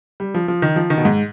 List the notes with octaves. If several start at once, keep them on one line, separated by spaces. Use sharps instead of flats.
G3
F3
F3
D#3
F3
D#3
B2
G#2